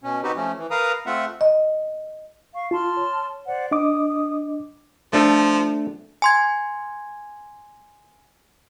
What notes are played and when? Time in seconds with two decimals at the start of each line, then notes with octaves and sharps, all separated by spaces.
0.03 B2 C#4
0.23 C4 D#4 F#4 G4 B4
0.36 F3 A3 C#4
0.57 E3
0.71 A#4 B4 F5 A#5 D#6
1.06 A3 C4 F4 E5 F#5
1.41 D#5
2.54 F5 C#6
2.71 F4 A5 C6 F6
2.97 C#5
3.47 C5 D5 F#5
3.71 D4 D#5 D6 D#6
5.13 F3 A3 D4 A4
6.22 G#5 C6 G#6